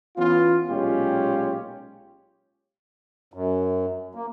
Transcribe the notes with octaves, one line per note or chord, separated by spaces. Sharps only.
E3 B3 C#4 F4
B1 A#2 G#3 C#4 F4 G4
F#2
A#3